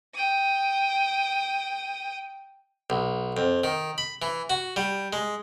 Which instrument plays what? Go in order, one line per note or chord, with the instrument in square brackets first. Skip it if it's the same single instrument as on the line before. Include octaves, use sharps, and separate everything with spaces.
[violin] G5 D#6
[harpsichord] B1
F2
D#3
B5
E3
F#4
G3
G#3